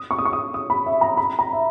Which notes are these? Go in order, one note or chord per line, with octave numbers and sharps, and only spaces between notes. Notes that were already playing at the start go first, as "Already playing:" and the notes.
Already playing: D#6
C#6
D#6
C#6
D#6
D#6
B5
E5
A#5
B5
A#5
E5